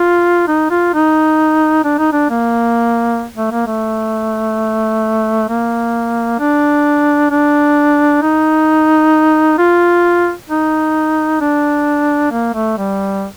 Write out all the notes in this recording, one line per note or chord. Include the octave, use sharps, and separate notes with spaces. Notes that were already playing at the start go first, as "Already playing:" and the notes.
Already playing: F4
D#4
F4
D#4
D4
D#4
D4
A#3
A3
A#3
A3
A#3
D4
D4
D#4
F4
D#4
D4
A#3
A3
G3